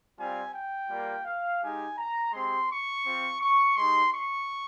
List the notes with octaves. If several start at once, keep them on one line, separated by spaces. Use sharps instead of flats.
G3 C4 F4 G#5
G5
G3 A#3 F4
F5
G#3 D#4 G4 G#5
A#5
G#3 C4 G4 C6
C#6
C4 F4
C#6
G#3 D#4 G4 C6
C#6